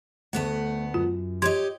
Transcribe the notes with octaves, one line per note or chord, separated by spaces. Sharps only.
D2 A3 B3 F#5
F#2 F4
G4 C#5 D#5 C6 G#6